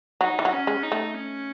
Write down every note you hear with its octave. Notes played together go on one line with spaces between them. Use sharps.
F#3 D#4
E3
F#3
C#4
G#3
D#4
A3
C#4